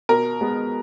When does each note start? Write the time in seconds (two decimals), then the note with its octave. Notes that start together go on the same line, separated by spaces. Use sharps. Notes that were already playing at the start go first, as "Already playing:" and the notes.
0.09 B2 A#4
0.41 G#3 B3